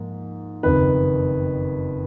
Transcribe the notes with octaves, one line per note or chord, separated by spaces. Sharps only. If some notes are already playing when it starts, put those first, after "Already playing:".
Already playing: G#2 F3 A#3
F#1 F2 D#3 B4